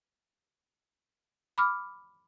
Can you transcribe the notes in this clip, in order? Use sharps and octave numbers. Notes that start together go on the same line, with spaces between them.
B5 D6 F6